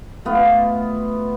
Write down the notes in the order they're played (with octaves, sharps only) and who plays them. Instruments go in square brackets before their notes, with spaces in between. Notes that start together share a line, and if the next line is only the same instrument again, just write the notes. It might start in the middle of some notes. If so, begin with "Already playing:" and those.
[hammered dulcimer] A3 B3 F4